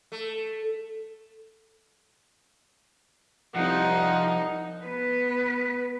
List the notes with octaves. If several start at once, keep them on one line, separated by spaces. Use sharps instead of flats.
A3
C2 F3 D#4 F#5
B3 B4